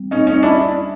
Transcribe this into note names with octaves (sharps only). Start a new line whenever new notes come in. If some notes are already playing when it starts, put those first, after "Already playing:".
Already playing: G3 C4
C#4 D#4
C#4 D#4
D4 E4